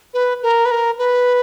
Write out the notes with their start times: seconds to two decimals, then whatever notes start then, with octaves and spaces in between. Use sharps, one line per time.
0.14 B4
0.43 A#4
0.65 B4
0.71 A#4
0.98 B4